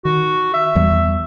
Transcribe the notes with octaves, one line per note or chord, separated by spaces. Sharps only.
D#3 F#4
E5
E2 E3 G3